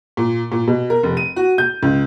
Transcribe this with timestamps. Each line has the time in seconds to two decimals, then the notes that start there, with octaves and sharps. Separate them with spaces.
0.17 A#2
0.52 A#2
0.67 B2
0.90 A#4
1.03 F1
1.17 D#7
1.36 F#4
1.58 G6
1.83 C#2